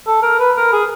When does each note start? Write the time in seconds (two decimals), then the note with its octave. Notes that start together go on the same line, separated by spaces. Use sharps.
0.07 A4
0.23 A#4
0.39 B4
0.57 A#4
0.73 G#4